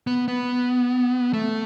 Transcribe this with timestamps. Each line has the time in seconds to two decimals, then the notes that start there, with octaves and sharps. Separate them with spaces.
0.07 B3
0.28 B3
1.33 A3